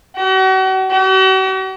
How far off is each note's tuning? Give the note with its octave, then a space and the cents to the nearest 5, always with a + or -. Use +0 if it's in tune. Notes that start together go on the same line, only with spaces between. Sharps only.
F#4 +40
F#4 +45